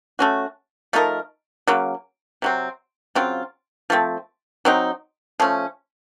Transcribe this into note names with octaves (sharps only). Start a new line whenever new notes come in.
A3 C#4 F#4
F3 A3 D#4 A#4
C#3 F#3 A#3
C3 F#3 C4
C#3 F#3 C4 F4
F3 A3 C4
F#3 C4 D#4
F3 A3 C#4